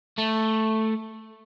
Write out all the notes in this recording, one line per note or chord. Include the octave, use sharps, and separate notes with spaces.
A3